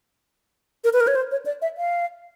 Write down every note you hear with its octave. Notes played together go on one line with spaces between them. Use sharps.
A#4
B4
A#4
C#5
C5
C#5
D5
E5
F5